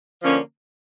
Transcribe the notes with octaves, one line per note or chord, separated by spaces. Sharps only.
D3 F3 A#3 C#4